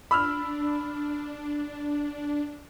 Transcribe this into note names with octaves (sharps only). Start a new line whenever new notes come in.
D4 B5 E6 F6